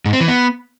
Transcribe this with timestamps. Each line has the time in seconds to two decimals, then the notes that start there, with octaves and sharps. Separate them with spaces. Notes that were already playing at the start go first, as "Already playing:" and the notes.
0.05 G#2
0.13 C4
0.21 E3
0.28 B3